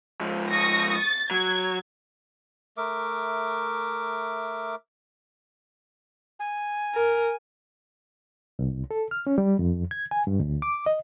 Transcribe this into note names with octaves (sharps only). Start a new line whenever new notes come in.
G#2 F3
C#6 D#6 A#6
A6
F#3 G#6
A3 A#4 E5 D6
G#5
A#4
C2
A4
F6
C#4
G3
F2
G#6
G#5
G2
D2
D6
D#5